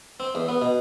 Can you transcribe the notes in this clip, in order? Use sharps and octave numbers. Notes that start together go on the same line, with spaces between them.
C4
E2
B3
B2